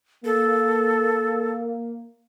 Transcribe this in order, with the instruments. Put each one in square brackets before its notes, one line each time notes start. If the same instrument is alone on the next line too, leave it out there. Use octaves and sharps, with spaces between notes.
[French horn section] A#3 [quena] A4